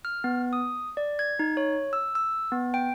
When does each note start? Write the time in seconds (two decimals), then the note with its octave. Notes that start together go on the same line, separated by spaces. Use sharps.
0.05 F6
0.24 B3
0.53 D#6
0.97 D5
1.19 G#6
1.39 D#4
1.57 C#5
1.93 E6
2.15 E6
2.52 B3
2.74 G5